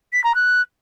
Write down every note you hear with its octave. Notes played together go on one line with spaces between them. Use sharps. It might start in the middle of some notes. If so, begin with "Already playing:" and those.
B6
A#5
F#6